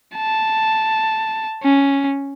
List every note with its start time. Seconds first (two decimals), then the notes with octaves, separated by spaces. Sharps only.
0.16 A5
1.63 C#4